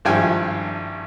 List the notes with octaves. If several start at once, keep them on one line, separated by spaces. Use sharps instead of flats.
G#1 G2 F3 E4 G5 G#5